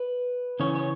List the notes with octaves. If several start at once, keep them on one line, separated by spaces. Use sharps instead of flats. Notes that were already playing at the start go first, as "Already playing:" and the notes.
Already playing: B4
C#3 E3 C#4 C#5
C#5